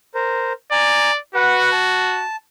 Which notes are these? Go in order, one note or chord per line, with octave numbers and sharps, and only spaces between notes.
A#4 C5
D5 G#5 A#5
F#4 B4 F#5
A5